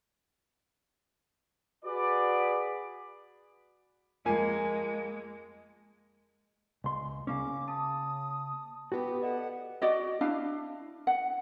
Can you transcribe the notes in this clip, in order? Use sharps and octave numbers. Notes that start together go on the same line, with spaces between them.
F#4 G#4 B4 D5
F2 G#3 A#3 G#5
C#2 C6
C#3 A#3 C#4 D6
A5 D#6
B3 F#4 G4
A4 D5 D#5 F#5
F#4 D5 D#5
D4 E4 F5
F#5